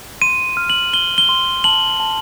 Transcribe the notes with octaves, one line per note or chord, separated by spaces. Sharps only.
C6 D#7
F6
F#7
C6 G7
G7
C6
A5 F#7
A5